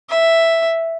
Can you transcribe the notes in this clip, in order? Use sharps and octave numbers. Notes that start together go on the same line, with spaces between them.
E5